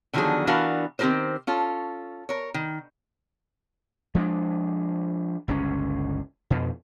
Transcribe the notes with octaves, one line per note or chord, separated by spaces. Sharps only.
D3 D#3 F3 F#3 B3 G#4
E3 B3 D4 F#4 A#4 F5
D#3 C4 G4 G#4 A#4 C5
C#4 F4 A4
A#4 C#5
D#3
F3 G#3 A#3 D4
G1 C#2 C4 C#4
F2 B2